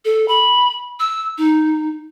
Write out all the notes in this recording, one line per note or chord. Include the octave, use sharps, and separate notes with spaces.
A4
B5
E6
D#4